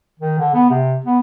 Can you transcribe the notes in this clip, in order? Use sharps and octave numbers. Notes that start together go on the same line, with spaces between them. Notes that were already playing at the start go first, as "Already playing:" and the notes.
D#3
D3
B3
C3
B3